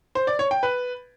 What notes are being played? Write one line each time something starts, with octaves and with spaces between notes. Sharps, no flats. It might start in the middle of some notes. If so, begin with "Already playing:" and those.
C5
D5
C#5
G5
B4